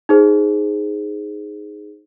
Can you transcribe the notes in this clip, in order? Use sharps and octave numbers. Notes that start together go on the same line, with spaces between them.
D#4 G#4 C5